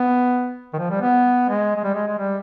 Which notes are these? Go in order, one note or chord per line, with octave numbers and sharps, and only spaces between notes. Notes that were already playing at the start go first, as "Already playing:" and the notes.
Already playing: B3
D#3
F3
G3
B3
G#3
G#3
G3
G#3
G#3
G3